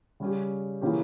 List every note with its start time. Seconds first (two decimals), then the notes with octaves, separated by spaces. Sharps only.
0.20 C#3 G3 C#4 G4
0.81 C#3 E3 A#3 C#4 G4